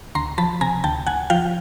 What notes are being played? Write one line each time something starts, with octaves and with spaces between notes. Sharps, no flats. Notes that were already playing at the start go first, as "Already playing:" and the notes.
D2 A#5 C6
F3 A5 B5
C3 G#5 A#5
D2 G5 A5
D2 F#5 G#5
F3 F5 G5